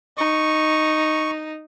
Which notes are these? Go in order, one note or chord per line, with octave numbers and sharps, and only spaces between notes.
D#4 C#6